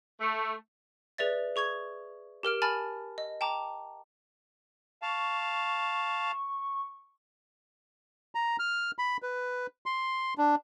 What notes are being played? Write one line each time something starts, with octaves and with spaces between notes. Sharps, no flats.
A3
G#4 B4 D5 E5 A6
G#4 C#6 G#6 F7
G4 A#4 F6 D7
G#5 A5 B5 F6 A6
D#5
G5 A5 A#5 D6
F5 A5 C#6
A#5
F6
B5
B4
C6
D4